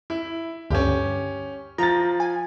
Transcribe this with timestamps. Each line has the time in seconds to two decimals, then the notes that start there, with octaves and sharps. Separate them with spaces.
0.10 E4
0.70 D2 G2 C#4 G4
1.78 F3 A#5 A6
2.20 G#5